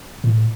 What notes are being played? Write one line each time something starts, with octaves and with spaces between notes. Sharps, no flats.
A2